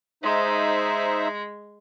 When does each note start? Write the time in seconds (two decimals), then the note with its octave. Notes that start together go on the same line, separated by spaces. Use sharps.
0.23 G#3 D#4 C5 E5